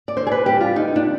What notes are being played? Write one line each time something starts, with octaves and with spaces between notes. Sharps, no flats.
D5
D3 C5
G#4
B4
G3 D4 G4
F4
D3 D#4
D4